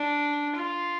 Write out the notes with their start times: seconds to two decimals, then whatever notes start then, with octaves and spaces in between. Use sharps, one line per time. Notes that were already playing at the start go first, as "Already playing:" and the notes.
Already playing: D4
0.55 F4